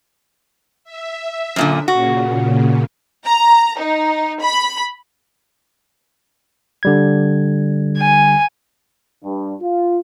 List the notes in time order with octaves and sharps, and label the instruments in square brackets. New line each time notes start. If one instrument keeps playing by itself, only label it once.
[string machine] E5
[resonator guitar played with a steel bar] F#2 A#2 D3
[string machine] A#2 C#3 [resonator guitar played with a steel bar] F#4
[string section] A#5
D#4
B5
[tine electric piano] D3 G3 G#6
[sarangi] G#5
[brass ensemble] G2
F4